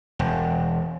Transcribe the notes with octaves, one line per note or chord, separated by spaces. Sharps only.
E1